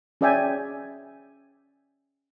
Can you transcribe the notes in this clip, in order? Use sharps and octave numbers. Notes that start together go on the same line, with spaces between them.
C#4 G#4 D5 E5 G5 G#5